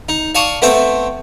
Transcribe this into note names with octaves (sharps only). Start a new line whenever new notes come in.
D#4
D5 F5 A5 C#6 D#6
A3 B3 C4 C5 E5 G5